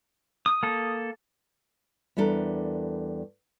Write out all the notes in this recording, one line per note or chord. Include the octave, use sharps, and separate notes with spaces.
D#6
A#3 A4
E2 G3 D4 A4 A#4